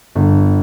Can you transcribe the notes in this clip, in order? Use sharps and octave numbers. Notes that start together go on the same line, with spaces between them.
G1